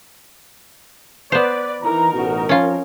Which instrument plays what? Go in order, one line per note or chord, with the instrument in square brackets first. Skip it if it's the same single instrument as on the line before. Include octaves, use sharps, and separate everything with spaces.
[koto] B3 C5 [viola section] B4 D5
[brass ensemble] E3 A#5 [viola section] D#4 A#4
[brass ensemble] A1 B2 F#4
[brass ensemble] F2 F3 [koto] C#4 F4